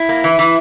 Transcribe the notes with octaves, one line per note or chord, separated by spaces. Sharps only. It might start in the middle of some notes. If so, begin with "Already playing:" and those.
Already playing: E4
A#3
E3
E3